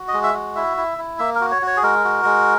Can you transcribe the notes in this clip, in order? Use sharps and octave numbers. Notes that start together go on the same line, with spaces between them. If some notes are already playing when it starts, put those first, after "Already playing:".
Already playing: F#4
D#5
G#3
E5
F#4
E4 E5
E4
E4
A#3 E5
A#4
F#4
C#5
F#4
C#5
G#4
G#3 A#4
F#4
G#3